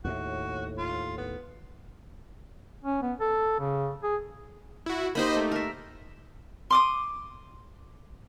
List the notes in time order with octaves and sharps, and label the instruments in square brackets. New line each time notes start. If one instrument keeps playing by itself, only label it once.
[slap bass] D#2 A2 [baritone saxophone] F#4
[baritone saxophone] F4
B3
[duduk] C#4
B3
A4
C#3
G#4
[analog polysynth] E4 F#4
[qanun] A#3 D#4 G4 [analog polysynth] C5 D#5 B5
[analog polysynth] A3
[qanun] A#4 E5
[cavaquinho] C6 D6 D#6